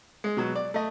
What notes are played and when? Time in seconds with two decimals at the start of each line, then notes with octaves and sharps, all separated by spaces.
0.24 G#3
0.37 B2 F#3
0.55 D5
0.74 A3 D#5